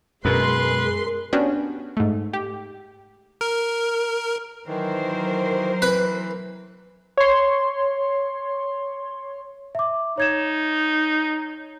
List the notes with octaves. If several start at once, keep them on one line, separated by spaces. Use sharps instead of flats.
F#2 B2 G#3 A#4 B4 C6
B3 C#4 D4 F#4 G4
G#2 A3
G4
A#4
D#3 E3 F#3 A#4 C5
E3 B4
C#5 C6
E5 D6
D#4 C#5 G#6 E7